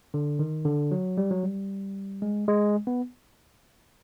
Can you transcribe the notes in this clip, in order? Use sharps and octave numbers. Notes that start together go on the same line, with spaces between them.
D3
D#3
D3
F#3
G3
F#3
G3
G#3
G#3
B3